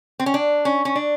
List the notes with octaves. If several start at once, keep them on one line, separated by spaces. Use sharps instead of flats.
C4
C#4
D4
C#4
C#4
D4